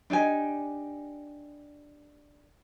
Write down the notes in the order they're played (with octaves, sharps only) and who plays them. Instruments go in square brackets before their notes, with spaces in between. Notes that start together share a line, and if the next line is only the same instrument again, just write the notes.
[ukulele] D4 D#4 G4 G#5